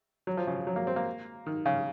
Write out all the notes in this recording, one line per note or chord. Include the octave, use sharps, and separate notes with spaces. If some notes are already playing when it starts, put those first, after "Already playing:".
F#3
F3
C#3
F#3
A#3
C4
A#3
D#3
C#3